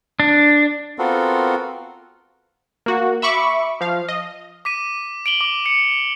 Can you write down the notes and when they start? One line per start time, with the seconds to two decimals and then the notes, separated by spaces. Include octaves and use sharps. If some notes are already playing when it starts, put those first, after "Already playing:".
0.20 D4
0.99 B3 C4 F4 F#4 A4 A#4
2.86 A#3 F#4
3.22 E5 B5 C#6 D6
3.81 F3 F5
4.08 D#5
4.65 D6 B6 D#7
5.26 D7 F#7 G7
5.41 D6
5.66 C#7